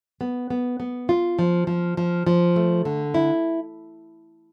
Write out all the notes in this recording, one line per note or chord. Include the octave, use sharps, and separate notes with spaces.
B3
B3
B3
F4
F3
F3
F3
F3
A3
D3
E4